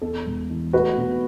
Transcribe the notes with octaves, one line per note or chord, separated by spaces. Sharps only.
E2 A4
E1
E3
A3 F#4 B4
B1